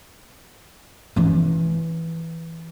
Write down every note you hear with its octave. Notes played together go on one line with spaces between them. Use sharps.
E3 C#4